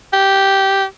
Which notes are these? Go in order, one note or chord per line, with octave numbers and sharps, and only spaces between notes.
G4